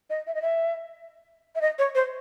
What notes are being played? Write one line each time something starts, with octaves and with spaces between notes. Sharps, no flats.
D#5
E5
D#5
E5
E5
D#5
C#5
C5